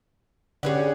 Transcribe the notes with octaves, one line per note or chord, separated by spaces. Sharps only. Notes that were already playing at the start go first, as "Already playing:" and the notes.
D3 C#4 G4 G#4 B4 C#5 D5 F#5